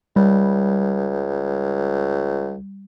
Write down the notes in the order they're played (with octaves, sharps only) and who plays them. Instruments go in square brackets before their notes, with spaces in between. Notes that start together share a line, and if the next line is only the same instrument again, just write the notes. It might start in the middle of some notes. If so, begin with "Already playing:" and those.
[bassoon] C#2 [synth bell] G3